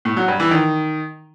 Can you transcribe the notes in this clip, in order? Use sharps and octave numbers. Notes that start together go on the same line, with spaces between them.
A2
F#3
G2
E3
D#3